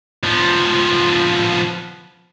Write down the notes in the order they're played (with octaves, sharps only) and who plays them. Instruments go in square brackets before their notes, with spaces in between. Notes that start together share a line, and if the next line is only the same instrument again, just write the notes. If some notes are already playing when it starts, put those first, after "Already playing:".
[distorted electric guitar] F3 B3